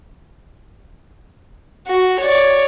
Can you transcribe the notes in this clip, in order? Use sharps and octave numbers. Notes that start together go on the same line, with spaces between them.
F#4
C#5 D5